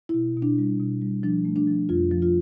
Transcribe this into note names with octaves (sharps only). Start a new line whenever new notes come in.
E4
B2
B2
D4
G3
B2
G3
F3 D4
A3
D4
F3
F2 F4
F3
F4